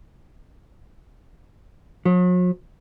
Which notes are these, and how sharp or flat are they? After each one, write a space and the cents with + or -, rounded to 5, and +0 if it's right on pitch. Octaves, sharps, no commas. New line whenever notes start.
F#3 -45